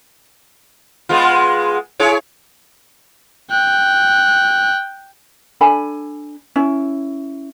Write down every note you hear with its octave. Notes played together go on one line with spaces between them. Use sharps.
G#3 B3 F4
E4 G#4 C#5
G5 F#6
D4 A4 G#5 B5
C#4 E4